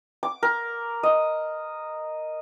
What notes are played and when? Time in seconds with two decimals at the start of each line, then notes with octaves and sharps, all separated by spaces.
0.23 D6
0.43 A#4
1.03 D#5